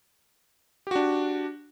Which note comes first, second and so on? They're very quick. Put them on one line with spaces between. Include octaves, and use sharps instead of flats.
G4 F#4 D4